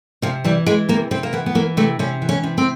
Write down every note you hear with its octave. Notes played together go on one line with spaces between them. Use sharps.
C3 F3
E3 G3
E3 G#3
C3 A#3
C3 C4
A#3
E3 B3
B3
E3 A#3
C3 A3
C3 C#4
E3
C#4
C3
C4